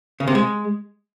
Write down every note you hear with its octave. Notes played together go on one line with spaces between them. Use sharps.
C#3
C3
G#3